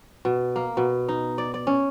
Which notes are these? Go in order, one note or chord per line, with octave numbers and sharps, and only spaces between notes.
B2
A#3
B2
D#4
D5
D5
C#4